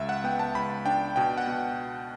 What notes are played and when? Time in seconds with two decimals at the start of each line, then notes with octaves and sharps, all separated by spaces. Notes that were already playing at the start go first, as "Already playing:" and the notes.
Already playing: C#2 E5
0.09 F#5
0.24 B3 G5
0.39 A5
0.54 C#2 B5
0.86 D4 G5
1.16 B2 G5
1.38 F#5
1.47 B2